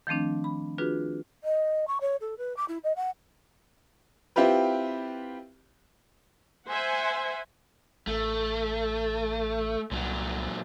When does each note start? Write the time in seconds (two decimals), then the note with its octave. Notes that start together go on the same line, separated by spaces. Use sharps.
0.07 D#3 F3 A3 C4 D4
0.44 B5
0.78 D4 F4 F#4 G#4 B4
1.44 D#5
1.88 C#6
2.01 C#5
2.21 A4
2.38 B4
2.57 D6
2.68 E4
2.84 D#5
2.96 F#5
4.36 C4 E4 F4 G4 B4
6.68 C5 E5 F#5 G#5
8.07 A1 A3
9.91 C2 A#2 F#3